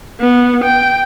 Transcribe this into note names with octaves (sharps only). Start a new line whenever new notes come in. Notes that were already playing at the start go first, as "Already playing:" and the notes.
B3
G5